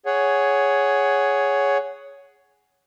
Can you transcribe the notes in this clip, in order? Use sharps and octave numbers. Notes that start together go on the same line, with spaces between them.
G#4 C#5 F#5